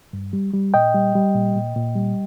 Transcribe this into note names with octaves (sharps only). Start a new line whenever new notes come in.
G2
G3
G3
A#2 D#5 G5
G3
G3
A#2
A#2
A#2
G3